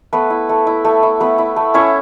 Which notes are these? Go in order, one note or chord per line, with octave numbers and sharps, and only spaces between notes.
A3 B3 B4
E4
A3
E4
A3
E4
A3 B3 B4
E4
A3
C#4 E4 C#5